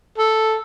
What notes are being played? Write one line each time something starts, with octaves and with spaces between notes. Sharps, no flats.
A4